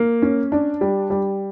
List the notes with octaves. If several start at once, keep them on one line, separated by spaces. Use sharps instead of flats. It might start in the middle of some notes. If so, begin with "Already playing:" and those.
Already playing: A#3
C#4
D4
G3
G3